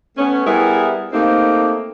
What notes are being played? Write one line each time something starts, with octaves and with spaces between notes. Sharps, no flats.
A3 B3 C#4
G3 B3 E4 G#4 A#4
A3 A#3 C4 D#4 G4